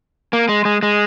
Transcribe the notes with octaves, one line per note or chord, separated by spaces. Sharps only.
A#3
G#3
G#3
G#3